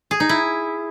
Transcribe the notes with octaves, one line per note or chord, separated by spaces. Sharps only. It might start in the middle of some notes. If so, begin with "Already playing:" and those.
G#4
D#4
E4